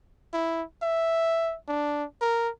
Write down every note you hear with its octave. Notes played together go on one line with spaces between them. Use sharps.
E4
E5
D4
A#4